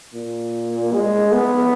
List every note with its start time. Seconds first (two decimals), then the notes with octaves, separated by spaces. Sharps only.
0.14 A#2
0.93 G#3
1.32 B3